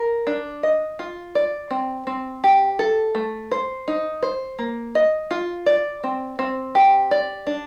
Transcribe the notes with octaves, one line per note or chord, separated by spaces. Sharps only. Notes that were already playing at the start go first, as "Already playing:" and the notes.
Already playing: A#4
D4
D#5
F4
D5
C4
C4
G4
A4
A3
C5
D#4
C5
A#3
D#5
F4
D5
C4
C4
G4
D5
D4